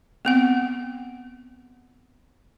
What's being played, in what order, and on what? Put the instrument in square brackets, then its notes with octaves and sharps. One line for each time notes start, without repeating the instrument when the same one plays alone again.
[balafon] B3 C4 F#5